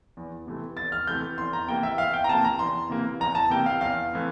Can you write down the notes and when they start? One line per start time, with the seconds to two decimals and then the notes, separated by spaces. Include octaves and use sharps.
0.17 E2
0.47 C3 E3 A3 C4
0.77 E2 A6
0.92 F6
1.07 C3 E3 A3 C4 G6
1.38 E2 C6
1.53 A#5
1.68 C3 E3 A#3 G5
1.83 E5
1.98 E2 F5
2.13 G5
2.24 A#5
2.29 C3 E3 A#3 A5
2.45 A#5
2.59 E2 C6
2.90 C3 E3 A#3
3.20 E2 A#5
3.35 A5
3.50 C3 E3 A#3 G5
3.66 F5
3.81 E2 F5
4.11 E3 A3 C4